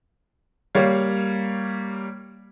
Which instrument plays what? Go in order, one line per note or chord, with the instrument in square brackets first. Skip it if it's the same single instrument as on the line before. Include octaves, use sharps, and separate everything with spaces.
[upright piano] G3 A#3 C#5 F5